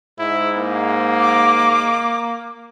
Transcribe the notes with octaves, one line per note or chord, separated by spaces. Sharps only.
G#2 E4
A#3
D6